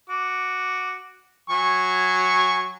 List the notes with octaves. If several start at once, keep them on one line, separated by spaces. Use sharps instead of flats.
F#4 D6
F#3 G#5 C#6